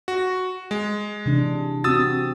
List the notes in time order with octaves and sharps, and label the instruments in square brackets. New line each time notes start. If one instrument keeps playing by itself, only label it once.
[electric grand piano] F#4
G#3
[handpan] C3 E3 D4
[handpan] C4 F#4 [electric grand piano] D#6 E6 A6